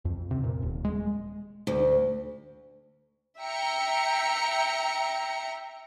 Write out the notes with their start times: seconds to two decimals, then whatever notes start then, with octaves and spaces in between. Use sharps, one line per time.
0.05 F2
0.31 C3
0.44 A#2
0.62 D#1
0.85 G#3
1.67 D2
3.40 E5 G5 A#5 C#7